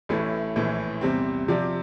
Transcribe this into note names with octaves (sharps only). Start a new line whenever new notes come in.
A1 A2 E3 A3 E4
A#1 A2 E3
E2 C3 G3 C4
C3 F3 C4 G4 D5